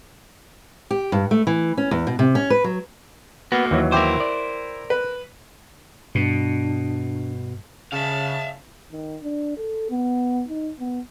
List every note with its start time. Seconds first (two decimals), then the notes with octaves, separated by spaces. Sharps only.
0.91 G4
1.12 G2
1.31 A3
1.47 E3
1.78 C#4
1.91 E2
2.07 B2
2.19 C3
2.35 C#4
2.50 B4
2.64 F#3
3.52 A#3 B3 F#4
3.71 D#2 E3 F#3
3.92 E4 A#4 C5 G5 D6
4.20 D5
4.90 B4
6.15 G2 B2 D4
7.92 C#3 E5 F5 A5
8.92 D#3
9.23 D4
9.57 A4
9.90 B3
10.48 D#4
10.79 B3